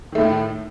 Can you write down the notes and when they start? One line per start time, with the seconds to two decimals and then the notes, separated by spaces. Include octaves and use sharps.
0.12 D#3
0.15 A3
0.18 A2